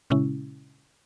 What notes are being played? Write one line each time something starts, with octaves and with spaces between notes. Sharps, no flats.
A#2 C#3 G#3 C#4 E4